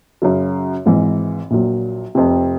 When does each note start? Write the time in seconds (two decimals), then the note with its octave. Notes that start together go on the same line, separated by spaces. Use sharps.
0.22 F#2 C#3 F#3
0.85 G#1 G#2 E3
1.51 A#1 A#2 F#3
2.15 F1 F2 C3